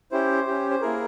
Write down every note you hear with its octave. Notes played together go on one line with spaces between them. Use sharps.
C#4 E4 G4 C5
C#4 G4
C5
A#3 E4 G#4 A#4